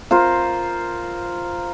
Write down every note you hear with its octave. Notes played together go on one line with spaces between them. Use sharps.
F4 A#4 C5